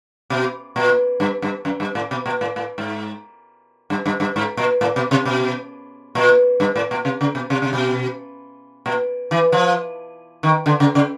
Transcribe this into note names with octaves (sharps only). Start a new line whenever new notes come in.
B2
A#2
G2
G2
F#2
G2
A2
B2
A#2
A2
A2
G#2
G2
G2
G2
G#2
A#2
A2
B2
C3
B2
A#2
G2
A2
A#2
C3
C#3
B2
C3
C3
B2
A#2
E3
F3
D#3
D3
C#3
C#3